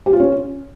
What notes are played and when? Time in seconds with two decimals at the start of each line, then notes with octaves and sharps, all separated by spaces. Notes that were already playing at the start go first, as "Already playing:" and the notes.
0.06 G4
0.13 F4
0.20 C#4